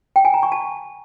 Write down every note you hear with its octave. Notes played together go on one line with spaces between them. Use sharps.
G5
G#5
A#5
C#6
A5